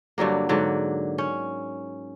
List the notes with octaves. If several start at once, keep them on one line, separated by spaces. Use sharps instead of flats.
G2 D3 F#3 A#3
G#2 D3 F#3
C#4